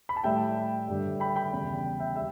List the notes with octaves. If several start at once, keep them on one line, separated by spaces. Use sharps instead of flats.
B5
A5
A2 G3 E5 G5
G2 D3 G3
G5 B5
G5 B5
E2 C#3 G3
E5 G5
G3 E5